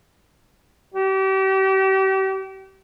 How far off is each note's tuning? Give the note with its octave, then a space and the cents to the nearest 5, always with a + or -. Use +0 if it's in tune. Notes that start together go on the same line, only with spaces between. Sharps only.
G4 -35